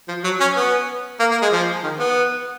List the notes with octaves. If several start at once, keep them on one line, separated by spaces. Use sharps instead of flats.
F3
F#3
C#4
B3
A#3
A#3
G#3
F3
D#3
B3